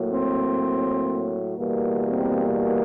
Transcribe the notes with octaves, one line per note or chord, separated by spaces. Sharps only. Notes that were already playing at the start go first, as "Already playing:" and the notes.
Already playing: A2 F#3 A#3
C4
E2 B2 G3 A#3
C4